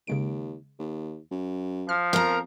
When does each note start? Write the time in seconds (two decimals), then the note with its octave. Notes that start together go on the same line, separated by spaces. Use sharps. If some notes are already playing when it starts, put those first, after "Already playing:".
0.07 D#2 C#3 G#3 D7
0.79 D#2
1.31 F#2
1.89 F3 F6
2.13 F2 A#4 A#5